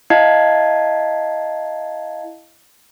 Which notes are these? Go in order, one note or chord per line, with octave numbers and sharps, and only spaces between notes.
E4 D#5 F5 A5 G#6 C7